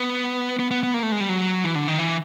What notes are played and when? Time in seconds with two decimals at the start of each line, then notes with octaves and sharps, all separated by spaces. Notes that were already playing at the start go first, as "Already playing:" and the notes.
Already playing: B3
0.59 B3
0.71 B3
0.83 B3
0.94 A#3
1.03 A3
1.12 G#3
1.20 G3
1.29 F#3
1.64 E3
1.75 D3
1.88 D#3
1.99 E3